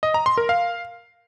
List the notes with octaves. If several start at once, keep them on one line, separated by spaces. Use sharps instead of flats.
D#5
A#5
C6
A#4
F5